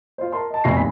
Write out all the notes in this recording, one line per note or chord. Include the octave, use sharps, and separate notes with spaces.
F4 C5
A#4 A5 C6
D#5 A5
F1 B2 G#5 C#6 A#6 C7
A#1 D#2 D#4 B5 B6